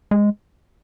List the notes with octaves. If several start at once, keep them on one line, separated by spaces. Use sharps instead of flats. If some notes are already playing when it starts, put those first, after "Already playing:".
G#3